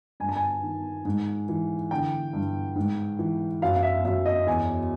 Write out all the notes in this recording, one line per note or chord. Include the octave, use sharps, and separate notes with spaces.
G2 G#5
A5
G#5
D#3
G#2
E3
D3 G5
G2
G#2
E3
F#2 F5
F5
E5
F#2 E5
D#5
E2 G#5